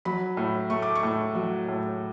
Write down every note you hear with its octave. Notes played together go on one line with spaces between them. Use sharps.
F#3 B5
A2
A3 C#6
D6
C#6
A2
F#3
A2